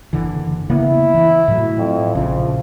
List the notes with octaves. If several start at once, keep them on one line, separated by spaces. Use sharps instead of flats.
F#1 D3 E3
C#3 A#3 B3 E4
E3
A2 F#3
F2
A#1 C#3 F3